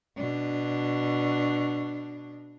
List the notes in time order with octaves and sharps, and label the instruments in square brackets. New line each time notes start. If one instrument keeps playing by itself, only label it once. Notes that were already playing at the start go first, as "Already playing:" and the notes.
[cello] B2 D4